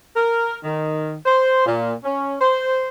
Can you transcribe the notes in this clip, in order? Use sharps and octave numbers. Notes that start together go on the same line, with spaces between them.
A#4
D#3
C5
A#2
C#4
C5